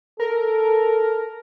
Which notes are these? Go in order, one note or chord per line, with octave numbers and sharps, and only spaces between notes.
A4 A#4